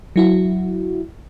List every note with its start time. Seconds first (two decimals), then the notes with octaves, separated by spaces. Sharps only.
0.16 F#3 E4 F#4